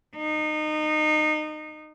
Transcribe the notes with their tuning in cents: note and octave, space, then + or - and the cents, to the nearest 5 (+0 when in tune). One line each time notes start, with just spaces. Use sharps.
D#4 -25